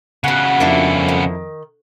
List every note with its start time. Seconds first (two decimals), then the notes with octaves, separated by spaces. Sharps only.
0.24 C#3 B3 F#4 F#5
0.60 F2 A#3 D4 E4
1.09 D#3